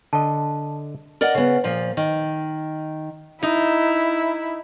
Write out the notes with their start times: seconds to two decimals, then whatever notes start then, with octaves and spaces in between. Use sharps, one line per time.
0.13 D3 D#5 A5
1.21 A#4 D5 D#5 F#5
1.35 C#3 B3
1.64 A#2 F3
1.97 D#3
3.43 D#4 E4